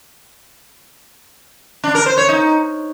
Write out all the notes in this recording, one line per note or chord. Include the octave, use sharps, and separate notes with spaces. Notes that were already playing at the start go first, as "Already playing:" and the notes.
D4
A#4
C5
C#5
D#4